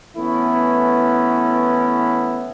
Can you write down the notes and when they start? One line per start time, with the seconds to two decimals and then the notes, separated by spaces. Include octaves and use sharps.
0.16 E3 A3 B3 C#4 E4